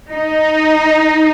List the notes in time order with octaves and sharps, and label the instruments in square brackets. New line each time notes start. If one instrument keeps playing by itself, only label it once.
[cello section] D#4